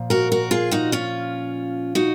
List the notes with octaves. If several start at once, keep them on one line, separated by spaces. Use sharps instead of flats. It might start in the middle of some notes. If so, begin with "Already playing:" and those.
Already playing: A#2 F3
F#4 A#4
F#4 A#4
F4 G#4
D#4 F#4
C#4 F4
D#4 F#4